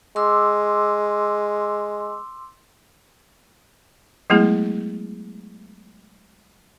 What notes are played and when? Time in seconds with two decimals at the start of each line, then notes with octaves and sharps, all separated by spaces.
0.16 G#3 C6 D6 E6
4.30 F#3 G#3 A3 B3 E4 G#4